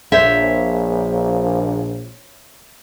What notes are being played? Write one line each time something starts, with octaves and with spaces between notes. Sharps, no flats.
A#1 C5 C#5 E5